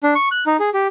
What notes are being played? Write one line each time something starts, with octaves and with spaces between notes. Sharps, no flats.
D4
C#6
F#6
D#4
G#4
G4